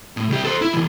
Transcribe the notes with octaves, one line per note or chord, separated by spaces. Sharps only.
A2
C2 G4
A4 C5
E4
B2 E3